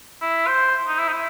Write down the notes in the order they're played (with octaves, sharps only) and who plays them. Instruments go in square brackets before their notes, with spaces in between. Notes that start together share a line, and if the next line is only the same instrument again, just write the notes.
[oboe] E4
C5
D#4
E4
D#4
E4